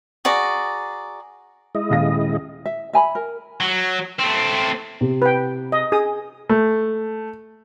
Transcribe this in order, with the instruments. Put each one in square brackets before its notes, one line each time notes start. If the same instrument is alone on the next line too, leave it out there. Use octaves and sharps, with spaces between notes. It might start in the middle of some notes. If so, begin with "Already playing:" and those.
[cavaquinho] F#4 G#4 D5 A#5
[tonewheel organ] G#3 E4 D#5
[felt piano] D#1 F5 A#6
[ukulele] E5
E5 G#5 A#5 B5
A#4
[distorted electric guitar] F#3
A3 C4
[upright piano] C3
[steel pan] B4 G5
D#5
G#4 D#6
[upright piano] A3